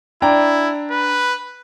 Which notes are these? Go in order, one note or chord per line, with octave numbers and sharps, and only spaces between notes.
D4 E4 G5 A#5
B4